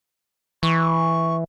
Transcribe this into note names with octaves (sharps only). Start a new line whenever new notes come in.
E3 C#6